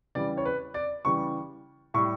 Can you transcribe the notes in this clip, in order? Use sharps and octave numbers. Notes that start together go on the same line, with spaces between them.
C#3 E3 G3 D5
C#5
B4
D5
C#3 E3 G3 C#6
A2 G3 C#6